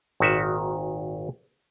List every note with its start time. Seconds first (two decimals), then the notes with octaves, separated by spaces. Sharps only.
0.20 G#1 A#2 D#3 F#4 B4 E5